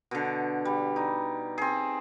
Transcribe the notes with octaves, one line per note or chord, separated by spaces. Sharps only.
B2 D3
G3
D#4
C4 G#4